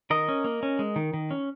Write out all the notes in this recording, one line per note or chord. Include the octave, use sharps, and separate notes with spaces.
D#3 A#4 D#5
C#4
A#3
C#4
G#3
D#3
D#3
C#4